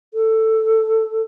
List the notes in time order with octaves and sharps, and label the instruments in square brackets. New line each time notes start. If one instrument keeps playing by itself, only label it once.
[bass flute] A4